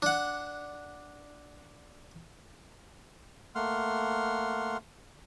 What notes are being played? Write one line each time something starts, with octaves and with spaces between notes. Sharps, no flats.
D4 F#5
A3 A#3 F#5 C6 F6